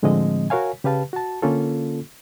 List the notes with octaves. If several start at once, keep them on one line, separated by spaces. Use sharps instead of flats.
A2 D3 F3 G#3 C4 D#5
F#4 A#4 C#5 F5 G#5
C#3 G4 B4 F5 A5
F#4 A5
D3 A#3 C#4 F4 A4